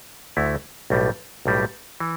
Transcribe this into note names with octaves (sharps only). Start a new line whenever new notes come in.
D2 D3 A3 E4
B1 A2 G3
B1 A2 G3
E3